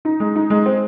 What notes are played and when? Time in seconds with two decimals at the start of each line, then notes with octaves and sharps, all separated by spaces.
0.05 D#4
0.20 G#3
0.36 D#4
0.50 G#3
0.66 C4